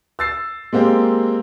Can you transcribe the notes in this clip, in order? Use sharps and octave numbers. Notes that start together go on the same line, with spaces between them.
E6 A6 C7
G#3 A#3 C4 G4